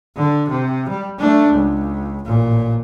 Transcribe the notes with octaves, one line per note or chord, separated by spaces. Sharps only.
D3
C3
G3
A3 D4
C#2
A1 A#2